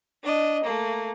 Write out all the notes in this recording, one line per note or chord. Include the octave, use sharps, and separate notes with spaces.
D4 D#5
A3 A#3